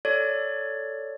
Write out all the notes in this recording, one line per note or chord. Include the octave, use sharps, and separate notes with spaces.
A4 C#5 D5